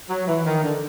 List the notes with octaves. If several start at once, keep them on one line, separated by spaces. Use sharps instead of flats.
F#3
E3
D#3
D3